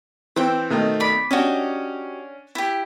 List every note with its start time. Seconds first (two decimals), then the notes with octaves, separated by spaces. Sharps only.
0.36 E3 C4 C5 G5
0.70 B2 D#3 A3
1.00 D5 B5
1.31 C#4 D4 F#4 G4 D#5
2.55 E4 G4